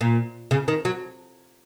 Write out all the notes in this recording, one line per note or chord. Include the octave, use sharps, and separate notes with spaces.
A#2
C#3
D#3
F#3